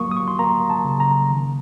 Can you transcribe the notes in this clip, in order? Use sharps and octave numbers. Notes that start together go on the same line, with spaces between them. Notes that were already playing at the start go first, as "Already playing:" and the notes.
Already playing: F#3 A#3 C#6 D#6
D#6
C#6
C6
A#3 A#5
A5
C#3
A#5
D#3